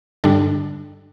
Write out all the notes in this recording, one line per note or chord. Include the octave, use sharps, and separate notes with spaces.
G2 D3 G3 D4 A4